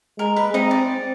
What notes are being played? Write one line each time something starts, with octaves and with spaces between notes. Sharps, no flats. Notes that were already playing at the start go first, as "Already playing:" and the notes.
G#3 A#4
B4
C4 D#4 D#5
D5